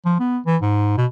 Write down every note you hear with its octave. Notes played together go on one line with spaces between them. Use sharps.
F3
B3
E3
G#2
B2